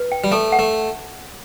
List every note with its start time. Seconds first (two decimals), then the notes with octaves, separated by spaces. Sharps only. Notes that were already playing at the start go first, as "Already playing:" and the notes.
Already playing: B4
0.12 G5
0.24 G3
0.32 A3 A4
0.52 F#5
0.59 A3